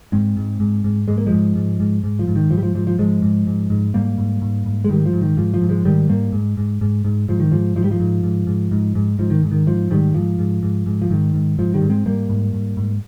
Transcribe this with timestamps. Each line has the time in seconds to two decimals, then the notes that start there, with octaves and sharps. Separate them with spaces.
0.12 G#2 G#3 C4
0.37 G#2
0.60 G#2
0.84 G#2
1.08 G#2 G#3
1.18 A#3
1.26 F3 G#3
1.32 G#2
1.56 G#2
1.80 G#2
2.04 G#2
2.19 F3
2.27 G#2
2.35 D#3
2.51 G#2 F3
2.57 G3
2.63 F3
2.75 G#2 F3
2.87 F3
2.99 G#2 F3 G#3
3.22 G#2
3.47 G#2
3.70 G#2
3.94 G#2 G3 A#3
4.18 G#2
4.42 G#2
4.66 G#2
4.84 G#3
4.89 G#2 D#3 G3
5.06 F3
5.13 G#2
5.21 D#3
5.37 G#2 F3
5.54 F3
5.61 G#2
5.69 F3 G#3
5.85 G#2 D#3 G3
6.09 G#2 G3 A#3
6.32 G#2
6.57 G#2
6.81 G#2
7.05 G#2
7.28 G#2 F3
7.40 D#3
7.52 G#2 F3
7.76 G#2 F3
7.84 G3
7.91 F3
8.00 G#2
8.23 G#2
8.47 G#2
8.71 G#2
8.95 G#2
9.19 G#2 F3
9.30 D#3
9.43 G#2
9.51 D#3
9.66 G#2 F3
9.90 G#2 D#3 G3
10.14 G#2 F3
10.39 G#2
10.63 G#2
10.86 G#2
11.02 F3
11.10 G#2 D#3
11.34 G#2
11.58 G#2 F3
11.74 D#3 G3
11.82 G#2
11.90 G#3 C4
12.05 G#2 G3 A#3
12.30 G#2
12.53 G#2
12.77 G#2